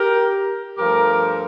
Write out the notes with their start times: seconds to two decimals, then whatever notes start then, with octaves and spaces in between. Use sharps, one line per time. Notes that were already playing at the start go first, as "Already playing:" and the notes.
Already playing: G4 A#4
0.78 G2 F3 A3 G4 A#4